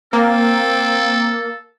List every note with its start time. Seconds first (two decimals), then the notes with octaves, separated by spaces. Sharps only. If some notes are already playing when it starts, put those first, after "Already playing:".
0.13 A#3 C4 A4